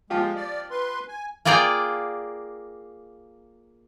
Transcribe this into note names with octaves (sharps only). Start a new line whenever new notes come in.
F3 G#3 F4 G4
D5
B4 C6
G#5
A#3 F4 G#4 D5 G5 A#5